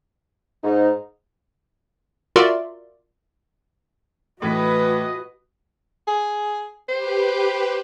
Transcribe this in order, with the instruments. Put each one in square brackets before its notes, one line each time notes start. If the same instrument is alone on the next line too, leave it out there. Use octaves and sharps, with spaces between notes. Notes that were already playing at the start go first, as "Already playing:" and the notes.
[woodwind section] G#2 [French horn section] D#4
[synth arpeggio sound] F4 F#4 A#4 D5 E5 C6
[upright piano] A2 E3 B6 [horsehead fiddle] F#4 [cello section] B4 [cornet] D#5
[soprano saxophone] G#4
[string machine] G4 B4 [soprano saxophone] C5